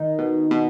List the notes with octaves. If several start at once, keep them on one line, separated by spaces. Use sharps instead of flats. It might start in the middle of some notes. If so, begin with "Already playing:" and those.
Already playing: D#3 D#4
B2
B2